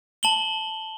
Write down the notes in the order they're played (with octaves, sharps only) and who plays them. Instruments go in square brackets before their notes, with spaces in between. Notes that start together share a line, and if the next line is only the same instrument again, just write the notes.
[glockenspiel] A5 F#7 G7